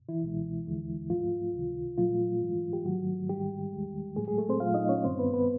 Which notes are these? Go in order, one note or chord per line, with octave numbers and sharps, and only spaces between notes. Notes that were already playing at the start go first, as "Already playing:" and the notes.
E3 E4
C#2 B2 G#3
D#2 D3 F3 G#3
G#2 F3 A3 F4
C#2 C3 D#3
A#2 F3 F#3 A3 F4
G#2 E3 G#3
G4
G#2 D#3 F#3 A3 F#4
G#2 D#3 G3 G#3 G4
D#2 D#3 G#3
A2 F#3 G#3 A3 G#4
G#3 G#4
A3 A4
C4 C5
A#2 F#3 A3 F4 F5
D#4 D#5
C#4 C#5
G2 D#3 G3 C4 C5
B3 B4
B3 B4